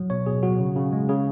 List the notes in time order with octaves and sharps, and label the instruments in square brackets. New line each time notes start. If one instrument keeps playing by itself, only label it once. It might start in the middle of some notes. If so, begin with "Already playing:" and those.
Already playing: [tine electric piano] F#3
B2 C#5
B2 G#4
F#3 F#4
C#3
C#3
G#3
C#3 G#4